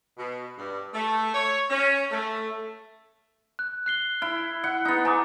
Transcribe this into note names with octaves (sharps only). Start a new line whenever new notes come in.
B2
G2
A3
C#5
C#4
A3
F#6
F#6 C7 G7
E4 F6
E4 F#5
B3 D#4
B3 G#5 A#5 D6